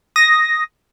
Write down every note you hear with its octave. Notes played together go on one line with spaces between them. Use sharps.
D#6 A#6